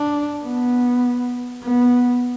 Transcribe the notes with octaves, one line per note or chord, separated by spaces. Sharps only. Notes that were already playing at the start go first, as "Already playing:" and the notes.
Already playing: D4
B3
B3